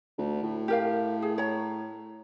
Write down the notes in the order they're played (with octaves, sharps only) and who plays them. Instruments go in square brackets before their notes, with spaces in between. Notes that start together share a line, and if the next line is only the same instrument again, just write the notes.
[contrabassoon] D2
A2
[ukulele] G4 A#4 F5
G#4
C#5 A#5